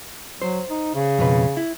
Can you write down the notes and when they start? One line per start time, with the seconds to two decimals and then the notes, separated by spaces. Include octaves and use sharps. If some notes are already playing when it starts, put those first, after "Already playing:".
0.42 F#3 C5
0.70 D#4
0.95 C#3
1.19 F2 B2 B4
1.57 E4